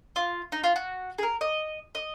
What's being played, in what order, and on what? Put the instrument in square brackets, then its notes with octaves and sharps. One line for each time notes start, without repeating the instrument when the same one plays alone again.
[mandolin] F4
D#4
F4
F#4
G#4
A#4
D#5
D#5